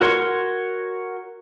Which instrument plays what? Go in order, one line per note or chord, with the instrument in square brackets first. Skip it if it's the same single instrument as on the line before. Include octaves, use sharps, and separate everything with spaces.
[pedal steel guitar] F#4 A#4 C#5 C6 C#6